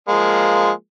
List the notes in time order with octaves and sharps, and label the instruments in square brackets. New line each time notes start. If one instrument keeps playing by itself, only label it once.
[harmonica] F3 G#3 A#3